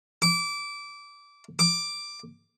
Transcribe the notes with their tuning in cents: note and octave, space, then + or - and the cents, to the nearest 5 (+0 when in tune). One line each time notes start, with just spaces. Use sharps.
D6 -20
D6 +5